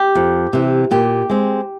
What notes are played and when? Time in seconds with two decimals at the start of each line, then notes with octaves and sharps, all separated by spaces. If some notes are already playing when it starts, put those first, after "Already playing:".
Already playing: G4
0.15 F2
0.53 C3 E3
0.91 A#2 G4
1.29 G#3 C4